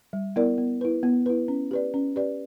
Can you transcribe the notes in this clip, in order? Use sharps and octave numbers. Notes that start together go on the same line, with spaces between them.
G3
B3 E4 A#4 D5
B3
E4 B4
B3
E4 B4
C#4
G4 B4 D5
C#4
G4 B4 D5